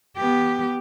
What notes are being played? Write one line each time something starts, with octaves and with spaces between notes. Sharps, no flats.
B3 G4